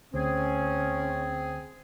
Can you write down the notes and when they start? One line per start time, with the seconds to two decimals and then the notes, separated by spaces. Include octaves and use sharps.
0.14 D2 C4 C#4 G#4